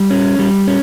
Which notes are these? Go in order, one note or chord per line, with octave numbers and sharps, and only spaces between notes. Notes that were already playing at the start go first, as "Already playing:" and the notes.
Already playing: G3
C#4
G3
C#4